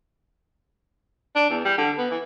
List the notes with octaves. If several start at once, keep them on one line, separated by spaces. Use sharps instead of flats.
D4
E2
G3
D3
B3
E3